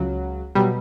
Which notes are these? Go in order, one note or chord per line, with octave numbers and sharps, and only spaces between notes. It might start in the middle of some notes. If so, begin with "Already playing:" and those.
Already playing: C#2 C#3 F#3
B2 F#3 G3